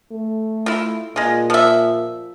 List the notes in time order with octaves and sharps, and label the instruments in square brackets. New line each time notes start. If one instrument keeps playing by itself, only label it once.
[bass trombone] A3
[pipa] E4 F4
[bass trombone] A#2 [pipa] G#3 F4
[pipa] F3 E5